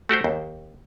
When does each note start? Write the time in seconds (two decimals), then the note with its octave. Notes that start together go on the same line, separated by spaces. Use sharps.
0.09 A3 F#4 G4 C5
0.24 D#2